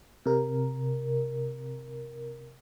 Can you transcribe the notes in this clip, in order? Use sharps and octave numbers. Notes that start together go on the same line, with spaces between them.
C3 A#4